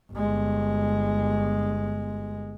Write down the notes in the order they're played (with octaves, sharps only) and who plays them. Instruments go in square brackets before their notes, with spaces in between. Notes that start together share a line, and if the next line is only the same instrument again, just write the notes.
[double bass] G1 G#3